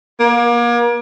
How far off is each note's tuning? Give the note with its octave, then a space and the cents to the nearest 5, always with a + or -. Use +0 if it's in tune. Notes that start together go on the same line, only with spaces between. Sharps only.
A#3 +35